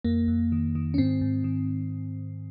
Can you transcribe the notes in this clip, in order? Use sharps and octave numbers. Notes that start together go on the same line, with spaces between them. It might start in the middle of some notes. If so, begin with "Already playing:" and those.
F2 A#3
F2
D#3
D#3
C#4
G#2 C4
G#2
D#3